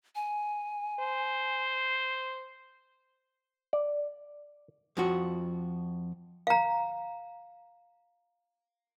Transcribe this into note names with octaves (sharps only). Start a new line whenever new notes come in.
G#5
C5
D5
F2 F3 F#4
F5 A#5